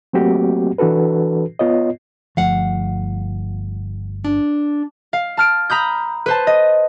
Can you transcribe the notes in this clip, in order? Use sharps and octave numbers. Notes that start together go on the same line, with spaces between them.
F#3 A3 A#3 C4 F#4 G4
E3 D4 F#4 A4 B4
B3 F4 C#5 D#5
G1 F3 A3 F5 F#5
D4
F5
A5 F6 D7
A#5 B5 D#6 G6
B4 C5 A5
D#5